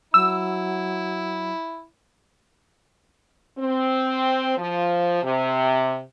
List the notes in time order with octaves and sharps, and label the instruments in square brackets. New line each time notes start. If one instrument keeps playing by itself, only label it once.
[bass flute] F#3 [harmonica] E4 [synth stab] E6
[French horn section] C4
F3
C3